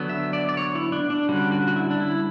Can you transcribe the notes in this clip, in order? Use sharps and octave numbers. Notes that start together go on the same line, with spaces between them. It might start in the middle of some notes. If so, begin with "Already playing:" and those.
Already playing: D3 F#3 B3
E5
D5
D5
C#5
E4
D4
D4
D3 G3 C#4 F#4
F#4
F#4
E4
D4
E4